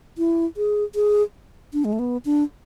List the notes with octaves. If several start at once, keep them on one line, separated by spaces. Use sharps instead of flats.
E4
G#4
G#4
D4
G#3
A3
B3
D4